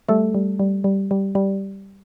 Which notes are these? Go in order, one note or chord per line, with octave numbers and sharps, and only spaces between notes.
G3 A3 A4
G3
G3
G3
G3
G3